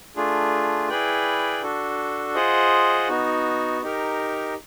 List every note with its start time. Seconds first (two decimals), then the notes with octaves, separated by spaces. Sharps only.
0.16 A3 D4 F4 G#4
0.89 E4 G#4 B4 D5 G5
1.62 D4 F#4 A4
2.35 F4 G#4 C5 D#5 F#5
3.08 B3 D#4 F#4
3.82 D#4 G4 A#4